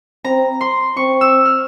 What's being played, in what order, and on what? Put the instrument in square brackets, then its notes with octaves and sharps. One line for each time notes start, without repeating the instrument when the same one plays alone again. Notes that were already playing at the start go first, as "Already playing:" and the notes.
[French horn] C4 [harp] A#5
[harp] C6
[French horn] C4 [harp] C#6
[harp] E6
F6